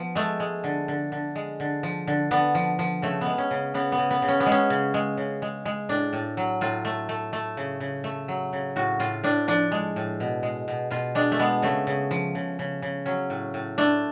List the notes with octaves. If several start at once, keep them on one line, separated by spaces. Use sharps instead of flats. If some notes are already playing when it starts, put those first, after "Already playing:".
Already playing: F3 B3
G#3 A3
G#3
D3
D3
D3
G#3
D3
F3
D3
D3 B3
F3
F3
C#3 A3
B3
G#3
C#4
C#3
C#3 B3
B3
C#3
B3
C#3
C#4
B3
G#3
C#4
C#3
G#3
C#3
G#3
G#3
A2 D4
A2
F#3
A2 F4
A3
A3
A3
C#3
C#3
A3
F#3
C#3
A2 F#4
A2 F4
A2 D4
F3 D4
G#3
A2
B2
G#3
B2
B2 F4
G#3 D4
A3
G#3 B3
C#3 A3
C#3
F3
C#3
C#3
C#3
F#3 C#4
A2
A2
A3 D4